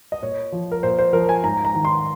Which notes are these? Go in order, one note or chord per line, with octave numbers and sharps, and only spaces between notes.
D#5
A#2 C#5
F3
A#4
A#2 C5
C5
F3 A#4
G#5
G#2 A#5
A#5
D#3
C6